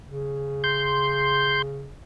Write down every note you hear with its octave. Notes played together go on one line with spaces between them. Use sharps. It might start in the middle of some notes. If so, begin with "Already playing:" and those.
C#3
C6 G6